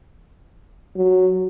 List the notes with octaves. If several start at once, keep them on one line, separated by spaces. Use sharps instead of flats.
F#3